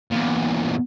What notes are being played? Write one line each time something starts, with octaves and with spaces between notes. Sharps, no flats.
E2 A#2